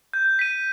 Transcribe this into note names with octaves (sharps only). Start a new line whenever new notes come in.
G6
B6 D#7